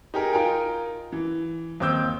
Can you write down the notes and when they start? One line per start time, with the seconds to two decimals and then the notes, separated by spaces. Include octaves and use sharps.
0.14 D#4 G4 G#4 A#4
0.33 D#4 F4 A#4 D#5 G5 G#5
1.12 E3
1.80 D#2 C4 D6 E6 G6